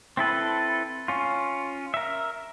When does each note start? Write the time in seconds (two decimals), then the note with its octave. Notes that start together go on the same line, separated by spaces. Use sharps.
0.17 C4 E4 A4 B4
1.08 C#4 F4
1.94 A#4 E5